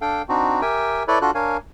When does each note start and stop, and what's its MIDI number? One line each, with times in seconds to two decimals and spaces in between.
0.01 0.22 62
0.01 0.22 69
0.01 0.22 77
0.01 0.22 79
0.29 0.61 60
0.29 0.61 62
0.29 0.61 63
0.29 0.61 66
0.62 1.03 67
0.62 1.03 70
0.62 1.03 76
0.62 1.03 79
0.62 1.03 80
1.08 1.19 64
1.08 1.19 69
1.08 1.19 71
1.08 1.19 73
1.08 1.19 74
1.22 1.31 62
1.22 1.31 65
1.22 1.31 66
1.22 1.31 69
1.22 1.31 90
1.35 1.57 62
1.35 1.57 70
1.35 1.57 73
1.35 1.57 77
1.35 1.57 80